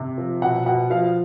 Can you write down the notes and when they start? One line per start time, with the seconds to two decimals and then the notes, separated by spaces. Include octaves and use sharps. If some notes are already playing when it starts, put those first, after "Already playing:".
Already playing: C3
0.18 F3
0.42 B2 F#5
0.66 B2 F#5
0.90 F3 F5